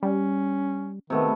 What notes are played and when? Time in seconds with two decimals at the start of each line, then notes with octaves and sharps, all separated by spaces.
0.03 G3 C#4
1.10 C3 D#3 A3 B3